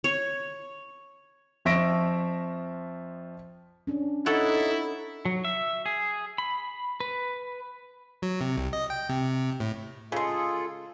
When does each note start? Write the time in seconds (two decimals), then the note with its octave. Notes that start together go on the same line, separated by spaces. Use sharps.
0.04 C#5
1.65 F2 F3 E5 C#6 A#6 D7
3.87 C#4 D4
4.26 D#4 E4 A4 C#5 F#5
5.25 F#3
5.45 E5
5.86 G#4
6.38 B5
7.00 B4
8.22 F#3
8.41 C3
8.57 C2
8.73 D#5
8.90 G5
9.09 C3
9.60 A2
10.12 C#3 G#3 F4 G#4 A4